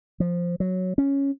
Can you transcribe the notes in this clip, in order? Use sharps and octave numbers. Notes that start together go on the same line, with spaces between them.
F3
F#3
C#4